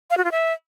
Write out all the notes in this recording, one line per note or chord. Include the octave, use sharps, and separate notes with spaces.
F5
F#4
F4
E5